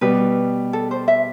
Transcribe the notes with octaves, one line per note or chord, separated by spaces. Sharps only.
B2 G3 B3 B4
A4
C5
E5